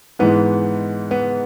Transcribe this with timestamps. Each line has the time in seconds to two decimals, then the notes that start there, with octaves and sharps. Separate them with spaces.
0.19 G#2 E3 G#3 B3
1.11 B3